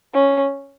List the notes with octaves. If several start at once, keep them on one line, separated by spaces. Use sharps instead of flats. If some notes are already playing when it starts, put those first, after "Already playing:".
C#4